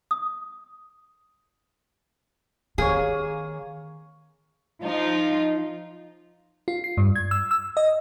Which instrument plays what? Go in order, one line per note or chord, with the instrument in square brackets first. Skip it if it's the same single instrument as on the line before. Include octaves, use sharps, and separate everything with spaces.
[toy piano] D#6
[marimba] D#3 [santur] A#3 C#5 [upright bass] C4 [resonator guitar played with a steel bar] G#4
[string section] F3 D#4 F4
[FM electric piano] F4
C7
G2
G#6
E6
E6
D#5